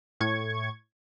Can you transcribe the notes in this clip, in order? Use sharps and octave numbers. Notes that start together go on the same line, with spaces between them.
A2 C#6 G#6